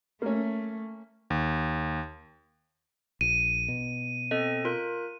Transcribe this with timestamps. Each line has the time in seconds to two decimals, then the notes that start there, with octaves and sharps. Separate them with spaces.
0.22 A3 A#3 C#4
1.30 D#2
3.21 A#1 D#7
3.68 B2
4.31 C4 A4 D#5
4.65 F4 A#4 F#6